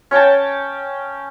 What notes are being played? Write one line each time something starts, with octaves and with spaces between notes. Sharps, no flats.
C#4 C#5 G5 A5